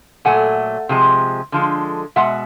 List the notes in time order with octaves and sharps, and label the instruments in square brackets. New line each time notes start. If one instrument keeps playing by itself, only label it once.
[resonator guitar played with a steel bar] A#2 F#3 A3 F#5 G#5
C3 F3 G#3
D3 F3 G#3
B2 G#3 E5 F#5